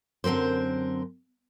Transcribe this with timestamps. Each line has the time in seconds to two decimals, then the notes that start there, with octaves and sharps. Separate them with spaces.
0.24 F#2 D3 C4 A#4 C5